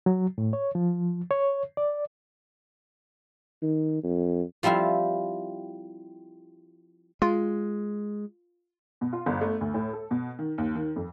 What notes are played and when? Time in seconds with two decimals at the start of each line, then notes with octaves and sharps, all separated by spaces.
0.06 F#3
0.38 A2
0.53 C#5
0.75 F3
1.31 C#5
1.77 D5
3.62 D#3
4.03 F2
4.63 F3 G3 C4 E4 F4
7.22 G#3 F4
9.01 B2
9.13 F4
9.26 G1
9.41 A3
9.61 D2
9.74 A2
9.93 A4
10.11 B2
10.39 D#3
10.58 D#2
10.75 D#3
10.96 F2